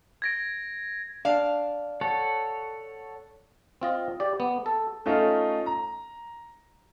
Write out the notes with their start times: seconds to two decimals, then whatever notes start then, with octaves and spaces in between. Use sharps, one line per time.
0.22 G#6 A#6 D7
1.25 D4 F5
2.01 A4 C#5 F#5
3.82 C4 F4 D#5
4.20 G4 D5
4.40 B3
4.66 A4
5.06 A3 C#4 D#4 F4
5.66 A#5